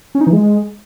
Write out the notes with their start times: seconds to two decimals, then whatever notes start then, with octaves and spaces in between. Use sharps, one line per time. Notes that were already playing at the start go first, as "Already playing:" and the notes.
0.15 C#4
0.21 D#4
0.27 E3
0.33 G#3